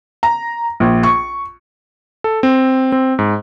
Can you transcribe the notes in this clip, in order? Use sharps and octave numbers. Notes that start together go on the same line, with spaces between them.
A#5
A#1
C#6
A4
C4
C4
G#2